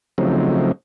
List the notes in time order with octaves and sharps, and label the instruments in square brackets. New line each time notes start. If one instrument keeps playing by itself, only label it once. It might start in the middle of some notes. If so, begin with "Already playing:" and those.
[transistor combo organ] C#3 F3 F#3 A3 C4 D#4